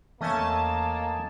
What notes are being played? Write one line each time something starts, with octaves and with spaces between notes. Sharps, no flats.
E2 A3 A#3 C#4 D#5 G#5 A5